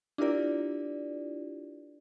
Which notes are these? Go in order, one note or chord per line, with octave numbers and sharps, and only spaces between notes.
D4 E4 F4 G4 A#4 D5